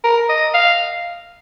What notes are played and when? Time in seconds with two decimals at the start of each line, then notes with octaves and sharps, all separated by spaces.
0.04 A#4
0.29 D#5
0.54 F5